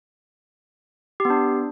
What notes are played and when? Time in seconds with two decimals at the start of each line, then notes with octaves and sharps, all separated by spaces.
1.20 G4
1.25 B3
1.30 D4